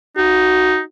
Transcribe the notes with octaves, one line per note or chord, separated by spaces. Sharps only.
D#4 F#4